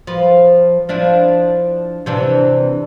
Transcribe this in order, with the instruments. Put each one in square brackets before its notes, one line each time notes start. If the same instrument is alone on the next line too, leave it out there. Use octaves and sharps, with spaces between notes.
[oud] F3 B4
F3 D4 E4
C3 E3 D4